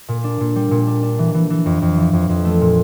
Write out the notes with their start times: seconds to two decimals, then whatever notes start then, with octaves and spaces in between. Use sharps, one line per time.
0.08 A#2
0.24 D4
0.40 A#2
0.56 G3
0.71 A#2
0.87 D4
1.03 D4
1.19 E3
1.34 E3
1.50 E3
1.66 F2
1.82 F2
1.97 E3
2.13 F2
2.29 F2
2.45 A3
2.61 A#2